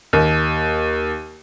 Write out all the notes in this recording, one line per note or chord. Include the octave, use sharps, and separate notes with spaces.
D#2